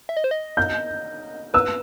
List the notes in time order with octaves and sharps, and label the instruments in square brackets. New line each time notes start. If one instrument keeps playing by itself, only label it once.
[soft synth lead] E5
D#5
C5
D#5
[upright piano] G6
[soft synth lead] B4 [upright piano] E6